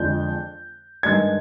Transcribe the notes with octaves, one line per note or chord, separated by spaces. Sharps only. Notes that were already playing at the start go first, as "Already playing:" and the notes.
Already playing: F2 D3 G#3 D4 G6
G2 D#3 G#3 D4 G#6